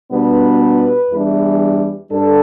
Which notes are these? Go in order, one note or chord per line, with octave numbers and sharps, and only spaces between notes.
B2 G3 B3 D4 B4
B4
E2 E3 G3 D4
G2 G3 D4 A4